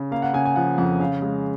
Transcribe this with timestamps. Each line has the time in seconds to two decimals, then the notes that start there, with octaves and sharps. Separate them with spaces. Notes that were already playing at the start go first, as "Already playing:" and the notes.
Already playing: C#3
0.11 A#3 F5
0.22 F#5
0.34 C#3 G#5
0.46 G#5
0.56 F3 F#5
0.78 F2 F#5
1.00 C#3 F5
1.22 G#3